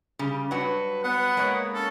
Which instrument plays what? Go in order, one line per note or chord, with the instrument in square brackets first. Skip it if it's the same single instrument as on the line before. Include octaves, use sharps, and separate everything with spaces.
[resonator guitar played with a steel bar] C#3 G3
[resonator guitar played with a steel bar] G2 F#3 F#4 [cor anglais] B4
[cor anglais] B3 [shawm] F#5
[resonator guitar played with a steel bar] G#3 A#3 C#5
[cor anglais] C#4 [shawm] A4